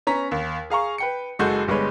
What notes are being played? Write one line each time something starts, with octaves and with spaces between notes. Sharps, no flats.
B3 C#4 A#5 B6
D#2
G#4 F5 A#5 C#6
B4 G5 C#7
F#1 G#3 F#4 A4 G6
G1 G3 G#3 B3 B4 C#5